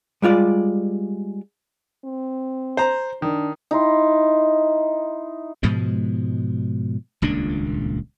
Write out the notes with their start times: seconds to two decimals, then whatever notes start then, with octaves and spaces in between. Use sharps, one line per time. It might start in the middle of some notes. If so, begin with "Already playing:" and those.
0.22 G3 G#3 F4 D5
2.04 C4
2.77 C5 A#5
3.22 D#3 D4
3.71 D#4 E4 C6
5.63 G#2 B2 F3 G#3
7.22 D#1 C#2 A#2 D4